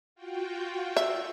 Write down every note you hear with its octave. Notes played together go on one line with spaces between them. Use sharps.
F4 F#4 G5
E5